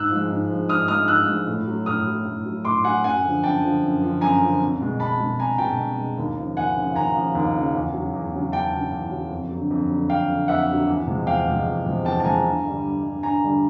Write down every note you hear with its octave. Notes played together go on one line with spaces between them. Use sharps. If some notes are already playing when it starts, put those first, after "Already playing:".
Already playing: G#2 E6 F#6
F3 G#3
G#2
F3 G#3
G#2 D#6 F6
F3 G#3 D#6 F6
G#2 E6 F#6
F3 G#3
A2
F#3
A2 D#6 F6
F#3
A2
F#3
A2 C6 D6
F#3 F#5 G#5
F#2 F#5 G#5
D3 F3
F#2 G5 A5
D3 F3
F#2
D3 F3
F#2 G#5 A#5
D3 F3
C2
B2 G#3
C2 A5 B5
B2 G#3
C2 G#5 A#5
B2 G#3 G5 A5
C2
B2 G#3
D#2
C#3 F3
D#2 F#5 G#5
C#3 F3
D#2 G#5 A#5
C#3 F3
D#2
C#3 F3
E2
C#3 F#3
E2
C#3 F#3
E2 G5 A5
C#3 F#3
E2
C#3 F#3
F2
D3 F#3
F2
D3 F#3
F2 F5 G5
D3 F#3
F2 E5 F#5
D3
F#3
E2
C3 F3 G#3
E2 F5 G5
C3 F3 G#3
E2
C3 F3 G#3
E2 G5 A5
A5
C3 F3 G#3 G#5 A#5
G2
D3 G3
G2
D3 G3
G2 G#5 A#5
D3 G3